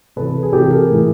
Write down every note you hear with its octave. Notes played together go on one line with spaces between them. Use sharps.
C3 E3 A4 B4
G#4
C3 E3 G4 A4
G#4 A#4
A2 E3